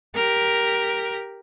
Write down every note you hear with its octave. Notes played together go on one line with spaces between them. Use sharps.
G4 A#4